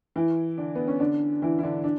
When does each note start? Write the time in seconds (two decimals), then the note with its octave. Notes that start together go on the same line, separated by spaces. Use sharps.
0.16 E3 E4
0.58 D3 D4
0.75 B3
0.88 C#4
1.00 D3 D4
1.42 E3 E4
1.59 E4
1.63 D3 D4
1.84 D4